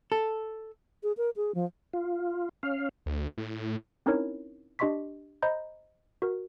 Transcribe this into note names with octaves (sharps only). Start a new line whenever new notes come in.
A4
G#4
A#4
G#4
F3
F4
C#4 F5
D2
A2
C4 C#4 D#4 E4 A#4 C#5
D4 G4 D#5 C6 C#6 B6
C5 D#5 A#5 B5 G6
F#4 A#4